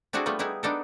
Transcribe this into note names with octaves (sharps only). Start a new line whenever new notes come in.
C4 D4 E4 F#4 G#4 A4
G3 A3 B3 F4 B4
G3 B3 D#4 E4 G#4
B3 D4 D#4 A4 A#4